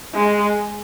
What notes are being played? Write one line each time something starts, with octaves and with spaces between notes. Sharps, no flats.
G#3